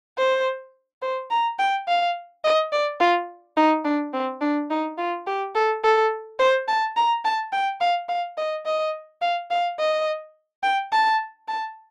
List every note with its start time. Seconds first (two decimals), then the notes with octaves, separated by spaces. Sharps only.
0.18 C5
1.02 C5
1.30 A#5
1.59 G5
1.88 F5
2.44 D#5
2.72 D5
3.00 F4
3.57 D#4
3.85 D4
4.13 C4
4.41 D4
4.70 D#4
4.98 F4
5.27 G4
5.55 A4
5.84 A4
6.39 C5
6.68 A5
6.96 A#5
7.25 A5
7.52 G5
7.81 F5
8.09 F5
8.38 D#5
8.66 D#5
9.21 F5
9.51 F5
9.79 D#5
10.63 G5
10.92 A5
11.48 A5